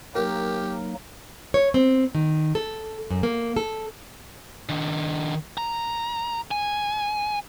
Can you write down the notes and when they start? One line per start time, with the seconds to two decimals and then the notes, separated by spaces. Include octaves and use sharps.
0.15 F#3 A#3 D#4 G4 A#4
1.54 C#5
1.74 C4
2.15 D#3
2.55 A4
3.10 F#2
3.23 A#3
3.56 A4
4.69 D#3 D4
5.58 A#5
6.51 G#5